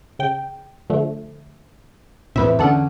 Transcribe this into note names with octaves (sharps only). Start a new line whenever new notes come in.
C#3 G5
D3 F3 A3
E2 A2 C3 B4 E5
E2 D3 C#4 D4 A4 F#5